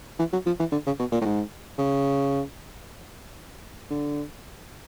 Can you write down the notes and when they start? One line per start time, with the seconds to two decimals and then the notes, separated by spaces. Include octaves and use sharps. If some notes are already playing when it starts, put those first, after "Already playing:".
0.19 E3
0.33 F#3
0.46 F3
0.59 E3
0.72 D3
0.86 C#3
0.99 B2
1.12 A#2
1.21 A2
1.25 G#2
1.78 C#3
3.90 D3